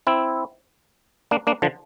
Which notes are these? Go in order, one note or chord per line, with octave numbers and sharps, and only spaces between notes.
C4 E4
A#3 D4
A#3 D4
D3 F3